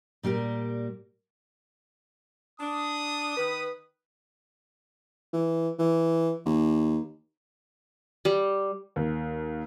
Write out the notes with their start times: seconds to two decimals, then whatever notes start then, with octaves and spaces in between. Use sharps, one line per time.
0.23 A#2 G3 G4 A#4
2.60 D4 D#6
3.37 D#3 B4
5.33 E3
5.79 E3
6.45 D#2
8.25 G3
8.96 D#2